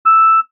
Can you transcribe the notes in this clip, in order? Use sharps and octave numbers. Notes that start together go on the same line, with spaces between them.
E6